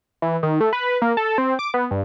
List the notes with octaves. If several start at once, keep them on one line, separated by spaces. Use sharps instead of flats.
E3
D#3
A3
B4
A#3
A4
C4
D6
B3
G2